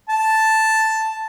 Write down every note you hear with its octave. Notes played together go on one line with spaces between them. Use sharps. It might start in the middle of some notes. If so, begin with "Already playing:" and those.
A5